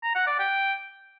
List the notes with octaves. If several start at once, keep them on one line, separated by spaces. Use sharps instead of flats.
A#5
F#5
D5
G5